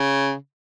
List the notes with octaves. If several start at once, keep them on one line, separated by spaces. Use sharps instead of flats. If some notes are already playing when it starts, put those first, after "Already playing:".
Already playing: C#3